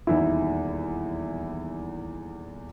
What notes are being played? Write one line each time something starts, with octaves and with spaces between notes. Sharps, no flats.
D#1 E2 D#4 E4